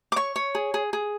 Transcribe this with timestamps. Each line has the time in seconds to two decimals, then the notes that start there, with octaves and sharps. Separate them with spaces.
0.12 D6
0.16 C#5 C#6
0.36 C#5
0.55 G#4
0.74 G#4
0.93 G#4